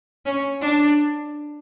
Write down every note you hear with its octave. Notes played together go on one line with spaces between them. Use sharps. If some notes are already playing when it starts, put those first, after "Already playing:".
C#4
D4